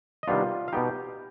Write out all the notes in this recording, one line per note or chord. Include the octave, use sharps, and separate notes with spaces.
D#5
C3 D#3 G3 B3 D4 F4 F5
F5
B2 B3 D#4 G4 G5